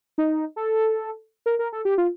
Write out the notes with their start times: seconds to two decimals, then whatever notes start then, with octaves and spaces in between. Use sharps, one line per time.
0.18 D#4
0.56 A4
1.46 A#4
1.59 A#4
1.73 A4
1.85 G4
1.98 F4